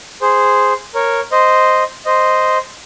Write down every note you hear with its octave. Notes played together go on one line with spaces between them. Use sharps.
G#4 C5
A#4 C#5
C5 D#5
C5 D#5